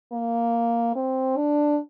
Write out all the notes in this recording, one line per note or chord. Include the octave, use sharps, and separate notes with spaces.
A#3
C4
D4